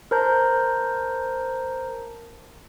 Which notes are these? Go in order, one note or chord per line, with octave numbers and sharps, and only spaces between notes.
A#4 C5 A5 A#5 G6